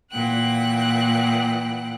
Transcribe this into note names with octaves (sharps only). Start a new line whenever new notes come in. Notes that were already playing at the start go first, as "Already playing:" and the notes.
A#2 E3 F#5 G5 F#6